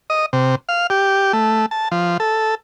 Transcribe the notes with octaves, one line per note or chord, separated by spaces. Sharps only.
D#5
C3
F5
G4
A3
A5
F3
A4